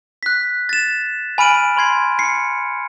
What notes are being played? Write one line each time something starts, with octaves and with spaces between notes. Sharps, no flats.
F#6 B6
A6 E7
G#5 B5 F6 D7 D#7 F#7
B5 C6 G#6 C7
C7 C#7